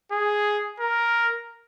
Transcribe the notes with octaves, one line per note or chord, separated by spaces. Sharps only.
G#4
A#4